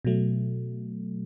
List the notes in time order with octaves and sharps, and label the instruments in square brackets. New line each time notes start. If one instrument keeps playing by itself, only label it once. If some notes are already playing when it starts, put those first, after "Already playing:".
[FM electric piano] B2 F#3 A3